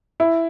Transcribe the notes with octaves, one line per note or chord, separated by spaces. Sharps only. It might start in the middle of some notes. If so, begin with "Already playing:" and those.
E4